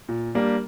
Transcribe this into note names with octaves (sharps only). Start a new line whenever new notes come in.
A#2
G3 A#3 D4 G4